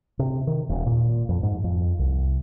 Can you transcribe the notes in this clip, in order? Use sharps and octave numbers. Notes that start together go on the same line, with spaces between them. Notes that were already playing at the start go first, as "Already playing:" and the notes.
C3
D#3
D#1
A#2
F2
G#2
F2
C2